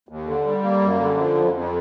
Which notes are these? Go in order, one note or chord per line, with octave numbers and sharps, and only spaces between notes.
D#2
D3
G3
A#3
F#2
D3
F3
F2
F2